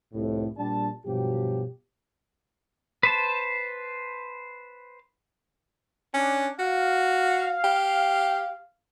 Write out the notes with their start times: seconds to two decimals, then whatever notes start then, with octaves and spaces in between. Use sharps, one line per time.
0.13 C2 F2 A2
0.58 A#1 G3 D4 A5
1.06 G2 B2 F3 F#3 G4
3.03 B4 C5 A5
6.14 C#4 D4
6.59 F#4 F5
7.64 G4